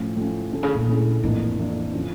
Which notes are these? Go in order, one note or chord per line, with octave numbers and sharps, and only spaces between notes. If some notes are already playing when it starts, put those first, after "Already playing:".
Already playing: A2 F3 A3 C#4
A2 F3 C#4
A#2 D3 A3 C#4 E4
C#3
A#2
D3 A3 C#4 E4
F2 A2 E3 A#3 D4
F2 E3 A#3 D4
D3 F3 C#4